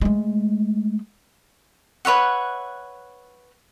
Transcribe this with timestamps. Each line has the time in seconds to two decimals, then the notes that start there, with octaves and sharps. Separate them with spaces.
0.01 G#3 A3
2.05 B4 C#5 E5 F#5